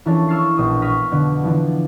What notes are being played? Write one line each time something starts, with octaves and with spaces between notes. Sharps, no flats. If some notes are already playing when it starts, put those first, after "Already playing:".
E3 F3 A#3 C#4 D4 A4
C#6 E6 F6 A6 C7
A#1 B2 D#6
C#6 D#6 F6 A#6 B6
F2 B2 D3
D3 E3 F3 B3